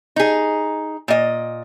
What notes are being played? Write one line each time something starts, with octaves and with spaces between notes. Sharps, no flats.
D#4 G#4
A#2 D#5